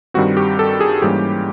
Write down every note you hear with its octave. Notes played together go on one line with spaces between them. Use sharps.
G2 D#3 G3 C4 F#4
G4
A4
G#4
G#2 E3 G3 A#3 C#4 G4